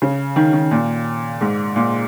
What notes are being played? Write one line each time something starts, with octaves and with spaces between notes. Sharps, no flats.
C#3
D#3
D#3
A#2
G#2
A#2